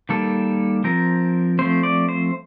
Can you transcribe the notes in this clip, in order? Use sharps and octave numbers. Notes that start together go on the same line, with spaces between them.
D#3 G3 A#3 A4
F3 C4 A#4
F3 A3 C4 C5
D5
C5